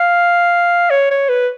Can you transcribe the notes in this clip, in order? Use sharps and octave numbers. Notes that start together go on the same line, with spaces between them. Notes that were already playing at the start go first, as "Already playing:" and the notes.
Already playing: F5
C#5
C#5
B4